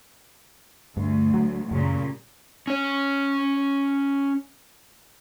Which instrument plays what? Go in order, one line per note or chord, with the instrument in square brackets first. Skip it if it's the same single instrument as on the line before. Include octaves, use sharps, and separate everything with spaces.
[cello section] D2 [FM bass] G2
[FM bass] F#3
[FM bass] F#2 [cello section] A#2 C#3 G3
[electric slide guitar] C#4 C#5